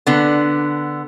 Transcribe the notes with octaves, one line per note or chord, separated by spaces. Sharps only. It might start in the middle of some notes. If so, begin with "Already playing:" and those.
D3 B3